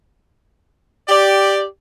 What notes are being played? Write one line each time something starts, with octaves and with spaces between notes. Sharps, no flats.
G4 D5